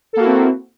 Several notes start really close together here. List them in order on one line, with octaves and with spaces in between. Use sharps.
A4 A#3 F#4 E4 C4